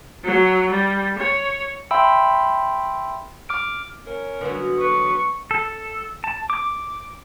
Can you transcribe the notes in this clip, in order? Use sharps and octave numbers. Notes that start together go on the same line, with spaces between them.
F#3
G3
C#5
E5 G5 B5 C6 E6
D6 F6 D7
C#4 A#4
D3 F#3 B3 F#4
B4 C#6
A4
A5
D6